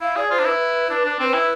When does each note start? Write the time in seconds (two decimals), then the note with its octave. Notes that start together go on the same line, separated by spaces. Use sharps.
0.01 E4 F5
0.16 G#4 D5
0.30 F4 C5
0.39 D4
0.46 E4 B4
0.90 D4
1.05 D4
1.20 C4 C5
1.24 B4
1.34 E4